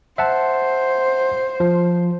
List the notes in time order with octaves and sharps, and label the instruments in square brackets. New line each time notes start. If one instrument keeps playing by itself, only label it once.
[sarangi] C5 [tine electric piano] E5 F#5 A5
[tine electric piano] F3